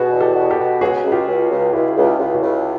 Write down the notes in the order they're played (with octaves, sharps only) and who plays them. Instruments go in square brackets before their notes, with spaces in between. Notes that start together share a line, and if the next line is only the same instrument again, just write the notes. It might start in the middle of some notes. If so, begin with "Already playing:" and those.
Already playing: [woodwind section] B2 [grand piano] F#4 G#4
[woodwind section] E2
[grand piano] G4 A4
[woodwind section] B2
[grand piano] G4 A4
[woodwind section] B2
[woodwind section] C#2 [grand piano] F#4 G#4
[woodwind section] C#2
[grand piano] F4 G4
[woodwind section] C#2
C#2
[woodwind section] C#2 [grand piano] E4 F#4
[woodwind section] C#2
[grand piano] F4 G4
[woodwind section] C#2
[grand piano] E4 F#4
[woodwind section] C#2